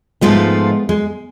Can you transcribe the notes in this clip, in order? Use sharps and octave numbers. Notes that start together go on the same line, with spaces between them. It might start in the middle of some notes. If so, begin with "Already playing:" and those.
G#2 F3 G#3 A3 B3 F4
G#3